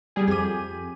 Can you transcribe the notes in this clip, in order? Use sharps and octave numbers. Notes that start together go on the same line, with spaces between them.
G3 G#4
F2 G4 G#4 D#7